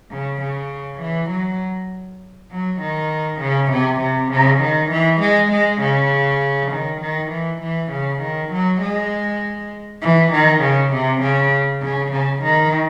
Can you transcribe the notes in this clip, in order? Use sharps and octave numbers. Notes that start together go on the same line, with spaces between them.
C#3
C#3
E3
F#3
F#3
D#3
C#3
C3
C3
C#3
D#3
E3
G#3
G#3
C#3
D#3
D#3
E3
E3
C#3
D#3
F#3
G#3
E3
D#3
C#3
C3
C#3
C#3
C#3
D#3